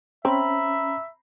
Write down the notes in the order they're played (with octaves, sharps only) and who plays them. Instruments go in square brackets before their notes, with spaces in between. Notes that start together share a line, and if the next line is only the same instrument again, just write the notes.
[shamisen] C4 [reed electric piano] C#4 [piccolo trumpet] E5 [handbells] A#5 B5